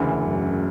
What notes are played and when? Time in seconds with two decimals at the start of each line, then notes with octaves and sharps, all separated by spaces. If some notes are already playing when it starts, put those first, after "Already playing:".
Already playing: E1 D2 C#3 E3
0.23 F#2